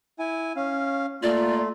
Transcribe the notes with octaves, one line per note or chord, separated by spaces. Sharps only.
E4 G#5
C#4 F5
A3 A#3 F4 D5